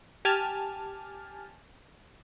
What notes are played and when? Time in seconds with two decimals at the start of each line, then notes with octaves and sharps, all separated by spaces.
0.25 G4 G#5 A5 F6